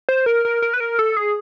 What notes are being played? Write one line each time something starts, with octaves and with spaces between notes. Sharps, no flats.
C5
A#4
A#4
A#4
B4
A#4
A4
G#4